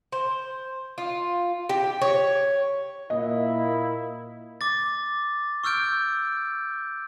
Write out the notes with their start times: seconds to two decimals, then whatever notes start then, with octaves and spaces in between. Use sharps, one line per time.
0.12 C5
0.98 F4
1.69 G4
2.02 C#5
3.10 A#2 A#3 E4 D#5
4.61 D6 A6
5.64 C#6 E6 F6 G6 D7